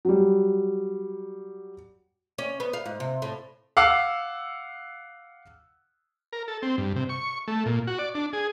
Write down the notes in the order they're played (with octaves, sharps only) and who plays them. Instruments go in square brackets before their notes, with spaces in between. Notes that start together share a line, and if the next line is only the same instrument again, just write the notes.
[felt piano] F#3 G3
[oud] C#4
B3
F5
G#2
C3
A2
[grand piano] F5 F#5 D6 E6 C7
[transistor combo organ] A#4
A4
C4
G2
C3
C#6
A3
A#2
F#4
D5
D4
G#4